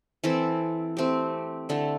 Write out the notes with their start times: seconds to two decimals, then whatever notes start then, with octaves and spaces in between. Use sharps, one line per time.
0.24 E3 C4 E4 A4
0.97 A3 C4 G4
1.69 D3 A3 E4